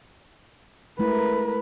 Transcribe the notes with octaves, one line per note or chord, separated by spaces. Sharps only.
G#3 A3 E4 A#4 B4